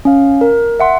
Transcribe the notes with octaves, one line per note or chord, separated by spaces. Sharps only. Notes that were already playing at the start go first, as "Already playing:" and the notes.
C#4 F5
A#4
E5 F#5 C6